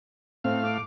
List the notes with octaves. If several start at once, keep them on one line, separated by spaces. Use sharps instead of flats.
A2 C4 F5
D6